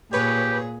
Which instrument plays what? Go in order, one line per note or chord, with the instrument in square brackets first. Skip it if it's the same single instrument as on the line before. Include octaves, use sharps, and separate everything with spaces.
[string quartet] A#2 G#4 [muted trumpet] G4 [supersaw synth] B4 C#5